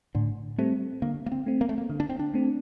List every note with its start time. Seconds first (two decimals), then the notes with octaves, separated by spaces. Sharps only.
0.15 A2 D3
0.58 G3 A3 C4
1.02 D3 A#3
1.26 A#3
1.32 C4
1.46 A3 C4
1.61 A#3
1.69 A3
1.78 A#3
1.90 D3
2.00 D4
2.09 C4
2.19 D4
2.34 A3 C4